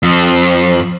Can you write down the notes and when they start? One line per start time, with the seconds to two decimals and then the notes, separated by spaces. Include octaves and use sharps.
0.03 F2